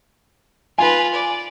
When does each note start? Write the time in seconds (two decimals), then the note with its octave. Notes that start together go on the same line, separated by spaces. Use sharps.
0.78 F4 B4 G#5
1.14 D5